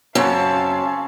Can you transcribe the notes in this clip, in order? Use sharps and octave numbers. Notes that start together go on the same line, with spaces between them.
F#2 C#3 C4 C#4 F5 A5